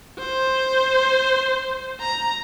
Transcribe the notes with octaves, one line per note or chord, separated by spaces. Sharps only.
C5
A#5